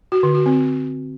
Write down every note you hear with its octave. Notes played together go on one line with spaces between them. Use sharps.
F#4
D3
F#4
C4